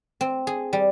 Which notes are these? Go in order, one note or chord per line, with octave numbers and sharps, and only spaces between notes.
C4
G#4
G3